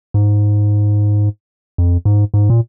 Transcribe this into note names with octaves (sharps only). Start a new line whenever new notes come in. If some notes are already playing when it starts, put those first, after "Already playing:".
G#2
F2
G#2
G#2
A#2